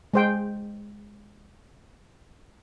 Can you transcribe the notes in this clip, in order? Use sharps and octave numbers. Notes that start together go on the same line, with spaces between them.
G#3 C5 G5